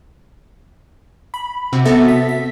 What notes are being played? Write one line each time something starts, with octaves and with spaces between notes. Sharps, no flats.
B5
C3 C4 F#4
B3 F#4 A4 E5 A6
B6
B6